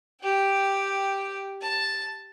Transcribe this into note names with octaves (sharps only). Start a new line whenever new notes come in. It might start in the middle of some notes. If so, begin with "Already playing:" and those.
G4 G5
A5